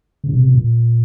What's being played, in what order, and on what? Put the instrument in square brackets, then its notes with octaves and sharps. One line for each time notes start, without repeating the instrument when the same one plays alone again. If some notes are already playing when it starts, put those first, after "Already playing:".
[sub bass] C#3
B2
C3
B2
A#2